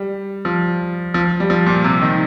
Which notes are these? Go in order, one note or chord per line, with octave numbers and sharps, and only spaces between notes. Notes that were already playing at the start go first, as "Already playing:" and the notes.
Already playing: G3
F3
F3
G3
F3
A#2
C3
D#3